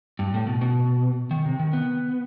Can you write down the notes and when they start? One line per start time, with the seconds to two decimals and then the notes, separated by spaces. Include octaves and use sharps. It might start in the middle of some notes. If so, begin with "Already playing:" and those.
0.19 G2
0.34 A2
0.47 B2
0.61 B2
1.31 D#3
1.46 C3
1.60 D#3
1.73 B3